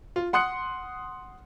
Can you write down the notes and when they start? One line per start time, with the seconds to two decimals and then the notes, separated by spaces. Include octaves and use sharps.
0.16 F4
0.33 F#5 C6 D#6 F#6 C#7